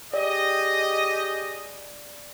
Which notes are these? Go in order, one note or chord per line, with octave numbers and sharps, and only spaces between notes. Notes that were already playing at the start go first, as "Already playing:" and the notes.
G4 G#4 D5 D#5